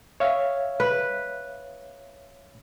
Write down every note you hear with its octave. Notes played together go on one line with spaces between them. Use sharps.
C#5 E5 F5
B4